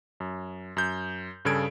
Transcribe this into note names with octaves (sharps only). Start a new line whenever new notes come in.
F#2
F#2 G6
G2 C#3 G#4 A4 G#6 D7